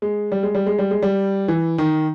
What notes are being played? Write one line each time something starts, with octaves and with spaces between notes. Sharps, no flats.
G#3
G3
G#3
G3
G#3
G3
G#3
G3
E3
D#3